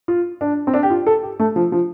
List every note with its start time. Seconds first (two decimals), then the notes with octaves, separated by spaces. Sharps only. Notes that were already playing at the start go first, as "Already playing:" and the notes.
0.08 F4
0.41 D4
0.67 C4
0.74 D4
0.83 G4
0.90 F4
1.07 A4
1.23 G4
1.40 A3
1.56 F3
1.72 F3